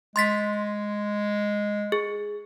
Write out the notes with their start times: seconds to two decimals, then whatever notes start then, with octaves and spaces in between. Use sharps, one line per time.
0.16 G#3 C6 A6 B6
1.92 G#4